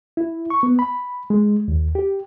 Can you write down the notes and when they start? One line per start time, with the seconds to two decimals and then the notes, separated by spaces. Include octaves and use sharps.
0.17 E4
0.50 C#6
0.63 B3
0.79 B5
1.30 G#3
1.68 D#2
1.95 G4